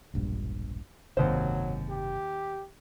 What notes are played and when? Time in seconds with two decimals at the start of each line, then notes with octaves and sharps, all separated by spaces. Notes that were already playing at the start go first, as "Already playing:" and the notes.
0.14 E1 A#1 G2
1.17 F#1 D#2 G#2 C3 F#3 C5
1.89 G4